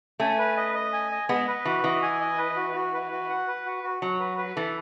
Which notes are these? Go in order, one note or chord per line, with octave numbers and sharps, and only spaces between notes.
A3 C#4 G#5
B4
D#5
D#5
G#5
D#5
G#3 B3 D#5
B4
E3 F#4
E3 D#5
G#5
D#5
B4
F#4
F#4
B4
F#4
F#5
B4
F#4
F#4
F#3 F#4
B4
B4
E3 A4